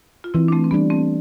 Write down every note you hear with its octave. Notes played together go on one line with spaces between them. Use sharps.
F4
E3 C4 E4
D4
A3 C4
C4
G3 B3 D4
A3 C4